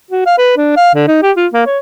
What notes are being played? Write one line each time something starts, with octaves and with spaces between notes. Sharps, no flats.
F#4
F5
B4
D4
F5
D3
D#4
G4
F4
A#3
C#5